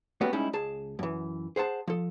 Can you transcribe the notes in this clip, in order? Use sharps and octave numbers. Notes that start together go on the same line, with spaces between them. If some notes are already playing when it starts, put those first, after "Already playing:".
A3 B3 C#4 F#4 G4
G3 G#3 C#4 D#4 E4
C#2 G#4 A5
F#2 E3
G#4 C5 F#5 A5
F3 A4